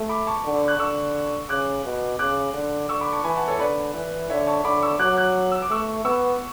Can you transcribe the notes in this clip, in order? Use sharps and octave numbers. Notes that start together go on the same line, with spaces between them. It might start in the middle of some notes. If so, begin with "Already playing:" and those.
Already playing: A3
B5 D6
A5 C#6
D3
F#6
D3 C#6 E6
C#3 D6 F#6
B2
C#3 D6 F#6
D3
D3 C#6 E6
B5 D6
A5 C#6
E3 G#5 B5
F#5 A5
A4 C#5
D3 B4 D5
E3
D3 C#5 E5
A5 C#6
D3 B5 D6
C#6 E6
F#3 D6 F#6
D6 F#6
E6
D6
A3 C#6 E6
B3 C#6 E6